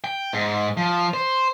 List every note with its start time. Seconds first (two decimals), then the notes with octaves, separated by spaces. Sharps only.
0.04 G5
0.33 G#2
0.77 F3
1.14 C5